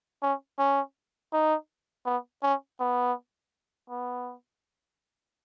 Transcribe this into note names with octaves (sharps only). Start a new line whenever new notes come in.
C#4
C#4
D#4
B3
C#4
B3
B3